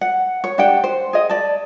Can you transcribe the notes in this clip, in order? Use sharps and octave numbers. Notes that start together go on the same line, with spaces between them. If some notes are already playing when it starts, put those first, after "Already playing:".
F#5
C#5
D4 G4 F#5 G5
C5
G#4 D#5
D5 A5